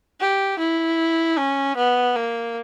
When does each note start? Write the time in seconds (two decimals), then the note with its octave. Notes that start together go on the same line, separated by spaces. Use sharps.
0.20 G4
0.59 E4
1.38 C#4
1.76 B3
2.15 A#3